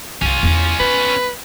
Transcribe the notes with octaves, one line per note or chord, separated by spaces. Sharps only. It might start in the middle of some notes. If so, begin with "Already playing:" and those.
C2 G2 C#4 F4
E2 E4
B3 B4